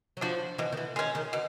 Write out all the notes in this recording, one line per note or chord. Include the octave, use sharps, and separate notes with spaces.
F#3
F3 D4 F#4
B2 E3
D#3
E3
D#3 G#3 C#4
D#3
B2